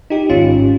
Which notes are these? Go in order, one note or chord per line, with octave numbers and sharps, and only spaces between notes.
D#4 G4
G#1 G#2 D#3 C#4 F4